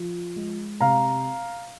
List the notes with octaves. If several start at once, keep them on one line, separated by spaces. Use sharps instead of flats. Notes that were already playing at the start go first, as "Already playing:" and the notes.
Already playing: F3
G#3
C3 F5 A#5